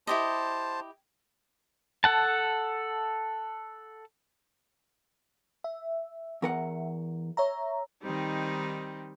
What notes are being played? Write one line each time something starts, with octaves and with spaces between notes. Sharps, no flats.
E4 G4 C5 D#5 A5
A4 F#5 A5
E5
E2 A#4 F#5
C#5 E5 A#5
D#3 G3 C4 D#4